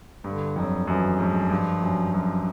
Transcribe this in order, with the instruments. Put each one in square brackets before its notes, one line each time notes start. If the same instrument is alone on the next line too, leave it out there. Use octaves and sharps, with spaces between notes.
[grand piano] G2 [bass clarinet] D3
[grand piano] F2 [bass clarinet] F#3
[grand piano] F#2 [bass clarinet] E3
[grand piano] G#2 [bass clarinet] F3
[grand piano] G2
F#2
[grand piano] F#2 [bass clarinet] F3